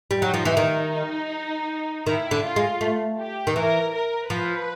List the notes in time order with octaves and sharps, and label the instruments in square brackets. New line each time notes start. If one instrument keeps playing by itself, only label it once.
[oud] G3
[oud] F#3 [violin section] D#4
[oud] F3
E3
[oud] D#3 [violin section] D#4
[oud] D#3 [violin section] E4
[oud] D3
[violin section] F4
[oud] G#3
A3
[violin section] G4
[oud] D#3
[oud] E3 [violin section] A#4
[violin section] A#4
[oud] F3 [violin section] B4